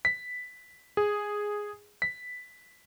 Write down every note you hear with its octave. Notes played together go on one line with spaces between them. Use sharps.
B6
G#4
B6